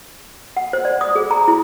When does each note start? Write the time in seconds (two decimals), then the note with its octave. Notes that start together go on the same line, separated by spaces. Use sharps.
0.57 F#5
0.73 C5
0.85 D5
1.01 D#6
1.15 G#4
1.31 A#5
1.48 E4